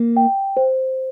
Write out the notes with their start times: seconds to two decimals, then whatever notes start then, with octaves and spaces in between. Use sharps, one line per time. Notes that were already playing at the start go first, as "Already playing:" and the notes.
Already playing: A#3
0.17 G5
0.57 C5